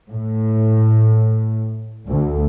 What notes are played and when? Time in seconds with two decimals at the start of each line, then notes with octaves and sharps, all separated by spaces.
0.11 A2
2.08 D2